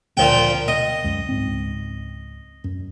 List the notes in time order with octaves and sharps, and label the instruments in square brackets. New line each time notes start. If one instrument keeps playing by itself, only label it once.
[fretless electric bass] D2 [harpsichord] A#2 F3 G5
[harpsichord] D#5
[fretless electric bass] C#2 F#2
C#2 G#2 C4
F#2